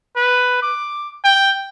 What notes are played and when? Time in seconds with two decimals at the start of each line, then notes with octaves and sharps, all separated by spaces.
0.16 B4
0.63 D6
1.24 G5